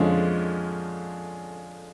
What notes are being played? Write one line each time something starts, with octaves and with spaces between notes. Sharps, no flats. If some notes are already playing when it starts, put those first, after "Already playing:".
Already playing: F2 D3 F3 G#3 C#4